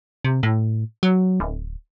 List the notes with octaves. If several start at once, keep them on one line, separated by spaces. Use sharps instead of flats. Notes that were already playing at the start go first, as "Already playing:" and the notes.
C3
A2
F#3
D1